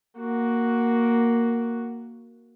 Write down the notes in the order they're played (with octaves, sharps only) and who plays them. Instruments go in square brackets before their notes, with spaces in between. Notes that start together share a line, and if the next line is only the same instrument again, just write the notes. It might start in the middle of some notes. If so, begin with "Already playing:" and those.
[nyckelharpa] A#3 F#4